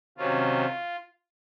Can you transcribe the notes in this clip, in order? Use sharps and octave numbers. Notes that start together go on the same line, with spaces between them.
C3 D#3 F#3 C#4 F4